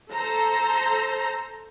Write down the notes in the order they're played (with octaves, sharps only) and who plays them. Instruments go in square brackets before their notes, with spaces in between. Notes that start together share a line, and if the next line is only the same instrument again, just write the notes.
[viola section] A4 C5 A#5